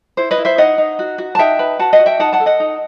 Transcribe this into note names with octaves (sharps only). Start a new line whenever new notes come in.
E4 C5
B4 D#5
E4
C5 E5
D#4 D#5 F#5
D#4
F#4
F#4
A5
D#4 E5 G5
B4
F#4 F#5 A5
D#5 F#5
F#4
E5 G5
D#4 F#5 A5
F#5 A5
A4
D#5 F#5
D#4